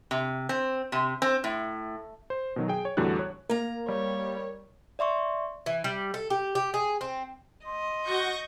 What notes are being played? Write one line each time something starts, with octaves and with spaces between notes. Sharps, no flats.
C3
C4
C3
C4
A2
C5
B2 D#3 F#3
G#4 G5
C#5
E2 A2 D3 G3 F#4 F#6
C#5
A#3 A#4 A#5
G3 C#5
D5 E5 C6 C#6
E3
G3
A4
G4
G4
G#4
C4
D#5 C6
F#4 C#6 G6 A#6